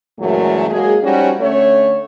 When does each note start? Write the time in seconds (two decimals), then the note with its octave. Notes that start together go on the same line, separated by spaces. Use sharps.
0.19 F#2 A#2 E3 F#3 G#3 A3
0.70 F#3 G#3 A#3 F#4 G#4
1.02 F3 G3 C#4 D#4 F#4
1.40 D3 A3 C#4 C#5